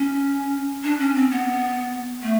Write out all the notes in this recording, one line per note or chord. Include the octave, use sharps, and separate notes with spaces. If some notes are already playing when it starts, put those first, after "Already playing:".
Already playing: C#4
D4
C#4
C4
B3
A3